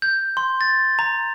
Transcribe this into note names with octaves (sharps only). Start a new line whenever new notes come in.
G6
C6
A6
A#5